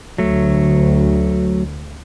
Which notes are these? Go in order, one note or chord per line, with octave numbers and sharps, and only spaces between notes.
D2 F#3 A3